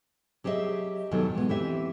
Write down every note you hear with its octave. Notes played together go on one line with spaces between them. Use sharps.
F#3 G4 G#4 D#5 E5
E2 B2 D#3 F#3 A4
G#3 B3
E3 C4 G4 E5